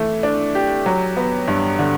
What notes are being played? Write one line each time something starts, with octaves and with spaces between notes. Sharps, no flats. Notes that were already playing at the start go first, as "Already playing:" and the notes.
Already playing: E3 A3
D4
G4
F#3
B3
G2
D3